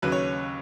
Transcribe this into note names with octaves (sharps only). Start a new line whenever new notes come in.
D#2 C#3 F#3 B4
C#5